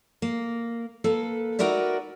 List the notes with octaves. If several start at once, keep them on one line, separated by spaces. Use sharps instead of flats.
A#3
A#3 A4 B4
D#4 F#4 A#4 B4 D5 E5